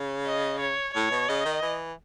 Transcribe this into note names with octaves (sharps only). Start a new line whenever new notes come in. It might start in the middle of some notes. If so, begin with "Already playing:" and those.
Already playing: C#3
D#5
C#5
A2 C#5
B2
C#3 D#5
D#3
E3